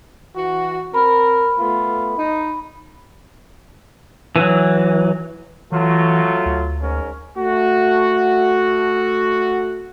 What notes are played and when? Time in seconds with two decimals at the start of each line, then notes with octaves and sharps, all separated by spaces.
0.36 E3 F#4
0.94 C4 A#4 B5
1.59 A3 B3 F4
2.18 D#4
4.36 E3 F#3
5.72 E3 F#3 A3 F4
6.46 D2
6.81 G#2 C#4 A#4
7.38 A3 F#4